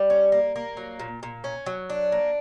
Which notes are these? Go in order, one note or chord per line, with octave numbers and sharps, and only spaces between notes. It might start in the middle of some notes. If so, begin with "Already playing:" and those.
Already playing: G3
C#4
A#3
A#3
F#3
A#2
A#2
C#4
F#3
D4
A#3